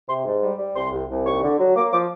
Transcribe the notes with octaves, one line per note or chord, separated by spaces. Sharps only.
C3 C6
G#2
G3
G3
C2 C6
C2
C2
D#2 C#6
D3
F#3
A#3 D6
F3 D6